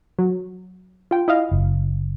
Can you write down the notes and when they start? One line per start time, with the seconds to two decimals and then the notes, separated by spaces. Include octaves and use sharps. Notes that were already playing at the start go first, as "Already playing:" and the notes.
0.19 F#3
1.11 F4 G5
1.28 E4 D#5 F5
1.51 F#1